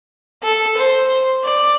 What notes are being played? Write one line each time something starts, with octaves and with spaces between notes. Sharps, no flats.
A4
C5
D5